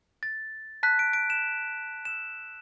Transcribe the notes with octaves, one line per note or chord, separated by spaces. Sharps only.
A6
A5 F#6 B6
D7
D7
E7
A5 E6 E7